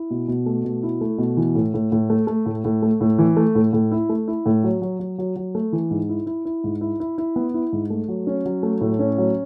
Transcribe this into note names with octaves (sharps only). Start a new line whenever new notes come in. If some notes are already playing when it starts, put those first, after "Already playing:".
Already playing: E4
B2
B2
A3
B2
E4
A3
B2
E3
A2
A2
A2
A3
A3
A2
A2
A3
A2
E3
A3
A2
A2
E4
A3
E4
A2
F#3
F#3
F#3
F#3
F#3
A3
E3
G#2
E4
E4
E4
G#2
E4
E4
E4
B3
E4
G#2
A3
F#3
C#4
F#3
A3
A2
C#4
F#3